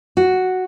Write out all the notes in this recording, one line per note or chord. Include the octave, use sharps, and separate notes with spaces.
F#4